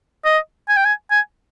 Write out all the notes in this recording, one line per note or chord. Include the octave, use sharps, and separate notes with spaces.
D#5
G#5
G5
G#5
G#5